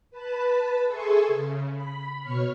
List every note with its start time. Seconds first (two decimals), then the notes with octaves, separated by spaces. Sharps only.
0.11 B4 A5 B5
0.86 G#4 A4 E5 G#5 C6 C#6
1.28 C#3
1.73 B5
2.20 B2 C#5 C#6 F6